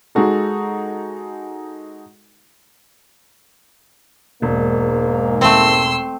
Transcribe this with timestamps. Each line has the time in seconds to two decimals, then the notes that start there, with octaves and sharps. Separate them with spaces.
0.15 G#3 D#4 F#4 A4
4.42 E1 G#2 A#3
5.41 A3 C4 C6 E6